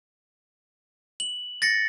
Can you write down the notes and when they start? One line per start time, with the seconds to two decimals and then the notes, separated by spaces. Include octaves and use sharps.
1.20 F#7
1.62 A6 A#6 C#7